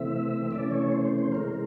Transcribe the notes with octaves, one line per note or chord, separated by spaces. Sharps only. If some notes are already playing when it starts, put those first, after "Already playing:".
Already playing: C3 E3 A3 C4 E5
C3 E3 A3 C#4 D5
C#5
C5
C5
C5
C3 E3 G#3 A#4